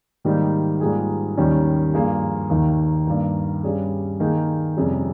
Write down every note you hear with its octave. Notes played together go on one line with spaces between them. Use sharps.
G#2 D#3 G3 A#3 D#4
G#2 G3 A#3 F4 G#4
D#2 D#3 G3 C#4
G2 F3 A#3 F4 G#4
D#2 D#3 A#3
G2 D#3 A#3
G2 G3 C#4 G#4
D#3 A#3 D#4 G#4
F2 C3 G3 C#4 G#4